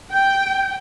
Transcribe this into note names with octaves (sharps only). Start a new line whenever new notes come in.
G5